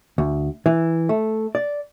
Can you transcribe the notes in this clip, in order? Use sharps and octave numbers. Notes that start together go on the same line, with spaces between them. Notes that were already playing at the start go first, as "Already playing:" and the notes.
D2
E3
A3
D5